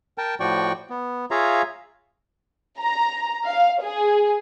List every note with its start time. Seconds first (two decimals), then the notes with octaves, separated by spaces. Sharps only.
0.18 A#4 G5 A5
0.40 A2 F3 F#4 D5 G5 C#6
0.90 B3
1.31 F4 G#4 C#5 E5 F5 A#5
2.79 A#5
3.47 F5
3.83 G#4